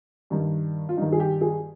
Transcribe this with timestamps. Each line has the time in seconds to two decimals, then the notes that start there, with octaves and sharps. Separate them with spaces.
0.30 G2 D#3
0.89 F4
0.97 G2 D#3 D#4
1.12 G#4
1.20 G4
1.41 G#4